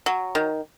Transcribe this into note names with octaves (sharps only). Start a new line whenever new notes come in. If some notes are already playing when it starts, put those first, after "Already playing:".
F#3
D#3